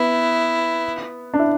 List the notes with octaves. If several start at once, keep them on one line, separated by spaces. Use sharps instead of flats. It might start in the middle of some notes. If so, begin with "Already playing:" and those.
Already playing: B3 E4
D4
E4